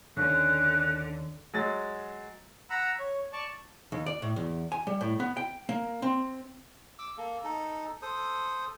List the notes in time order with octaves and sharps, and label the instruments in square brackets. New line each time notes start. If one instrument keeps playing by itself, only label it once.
[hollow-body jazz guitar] D#2 C#4 [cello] D3 [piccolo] F#6
[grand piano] F#3 G#3 A6
[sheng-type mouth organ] F#5 A#5 B5 E6
C#5
D5 A5 C#6
[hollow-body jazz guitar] D#2
D5
A2
E2
G#5
G3
A2
B3
G5
A#3
C4
[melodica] D6 E6
A#3 A4
D#4 A4
A4 C5 D#6